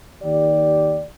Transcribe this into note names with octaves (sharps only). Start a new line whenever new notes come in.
D#2 D#3 G4 D5